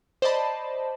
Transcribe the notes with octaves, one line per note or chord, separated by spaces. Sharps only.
C5 D5 D#5 A5 B5